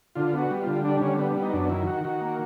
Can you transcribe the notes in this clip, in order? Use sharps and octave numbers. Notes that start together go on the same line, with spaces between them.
D3 F4
B3
F#4
G3
F4
D3
G3 D4
D3 C#4
G3 B3
B3
D#4
F#2 D4
D#3 E4
D#3 F#4
D#3 F#4
A#3